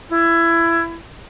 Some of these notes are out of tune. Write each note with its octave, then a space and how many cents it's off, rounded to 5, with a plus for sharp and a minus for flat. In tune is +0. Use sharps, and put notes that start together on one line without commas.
E4 +20